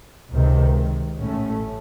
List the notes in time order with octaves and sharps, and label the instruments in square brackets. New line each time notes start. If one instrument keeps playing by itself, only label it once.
[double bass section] C#2 C3 D#3
A1 A2 A3 C#4